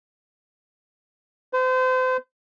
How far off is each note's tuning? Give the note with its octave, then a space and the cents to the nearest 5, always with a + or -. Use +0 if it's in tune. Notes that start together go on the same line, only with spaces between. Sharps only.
C5 -35